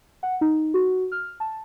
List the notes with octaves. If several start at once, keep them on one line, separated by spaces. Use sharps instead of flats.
F#5
D#4
F#4
F6
A5